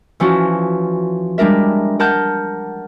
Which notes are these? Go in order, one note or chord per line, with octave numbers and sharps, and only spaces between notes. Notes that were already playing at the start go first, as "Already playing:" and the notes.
E3 F3 C#4 E4 F#4
G3 G#3 D4 A#4 E5
A#4 F#5 A5 F6 G6